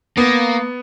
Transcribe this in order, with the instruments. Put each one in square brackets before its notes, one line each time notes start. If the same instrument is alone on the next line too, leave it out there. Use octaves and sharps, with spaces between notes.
[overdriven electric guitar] A#3 [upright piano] B3